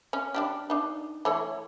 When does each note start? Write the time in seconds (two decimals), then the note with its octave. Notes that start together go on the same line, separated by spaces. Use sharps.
0.13 C#4
0.34 G3 D4 G4
0.70 D4 D#4
1.25 E3 A3 C#5